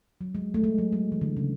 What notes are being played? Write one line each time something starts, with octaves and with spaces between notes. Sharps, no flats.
F#3
G#3
A3
G#3
F#3
G#3
E3
D3
C#3